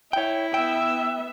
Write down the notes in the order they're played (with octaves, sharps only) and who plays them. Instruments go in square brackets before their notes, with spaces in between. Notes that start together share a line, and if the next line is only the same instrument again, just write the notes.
[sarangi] E4 [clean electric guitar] C#5 G5
[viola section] B3 E5 [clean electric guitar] G5